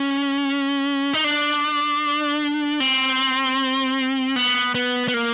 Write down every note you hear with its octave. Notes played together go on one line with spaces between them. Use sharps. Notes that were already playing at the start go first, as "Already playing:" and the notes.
Already playing: C#4
D#4
D4
C4
B3
B3
B3
A#3